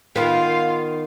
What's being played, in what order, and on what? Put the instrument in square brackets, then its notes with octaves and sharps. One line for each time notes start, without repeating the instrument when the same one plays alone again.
[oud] D#3 B3 [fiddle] F4 [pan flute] F5